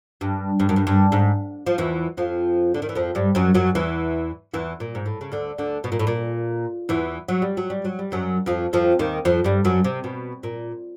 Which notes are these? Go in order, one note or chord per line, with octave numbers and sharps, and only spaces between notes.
G2
G2
F#2
G2
G2
G#2
F3
E2 E3
F2 F3
D3
D#3
E3
F2 F3
G2 G3
F#2 F#3
F#2 F#3
E2 E3
E2 E3
A#2
G#2
A2
C#3
D2 D3
D2 D3
B2
A#2
A2
A#2
E2 E3
F#3
G3
F#3
G3
F#3
G3
F#2 F#3
F2 F3
F2 F3
D#2 D#3
F2 F3
G2 G3
F#2 F#3
C3
B2
A#2